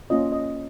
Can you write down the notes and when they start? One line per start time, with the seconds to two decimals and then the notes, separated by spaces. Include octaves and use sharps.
0.10 A#3 C#4 F4 D#5
0.32 D#5